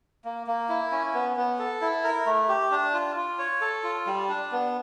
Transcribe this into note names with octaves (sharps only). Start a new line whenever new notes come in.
A#3
A#3
E4
C#4
B3
B3
A4
E4
A#4
A3
G4
D4
F4
F4
C#5
A4
F4
G3
D4
B3